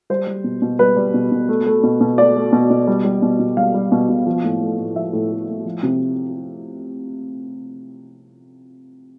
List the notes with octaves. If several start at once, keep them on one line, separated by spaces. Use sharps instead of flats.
G3 C5
G3
B2
B2
G3 B4
G3
B2
B2
A3
A3
B2
B2
A3 D5
A3
B2
B2
G3
G3
B2
B2
G3 F5
G3
B2
B2
F3
A2
A3
A2
F3 E5
A2
A3
A2
F3
C3